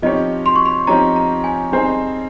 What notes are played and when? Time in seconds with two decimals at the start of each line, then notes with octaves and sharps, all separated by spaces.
0.02 F3 C4 D#4 G4 C#5 D#5
0.46 C6
0.56 C#6
0.66 C6
0.87 F3 C4 D#4 G4 C#5 A#5
1.16 A#5
1.44 G#5
1.72 G3 C4 D#4 G#4 C5